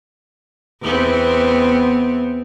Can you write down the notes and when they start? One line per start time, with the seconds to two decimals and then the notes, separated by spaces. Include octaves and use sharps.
0.82 E2 B3 C4